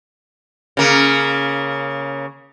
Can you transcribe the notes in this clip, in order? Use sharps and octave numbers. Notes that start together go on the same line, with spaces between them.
C#3 A#3